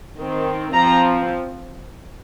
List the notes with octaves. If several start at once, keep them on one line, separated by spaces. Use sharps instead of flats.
D#3 C4
F3 C4 A#5